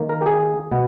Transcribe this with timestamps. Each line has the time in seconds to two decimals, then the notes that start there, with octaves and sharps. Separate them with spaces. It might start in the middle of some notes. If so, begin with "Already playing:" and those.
Already playing: D#3 A#3
0.09 A#4
0.22 G4
0.26 G#4
0.72 B2 B3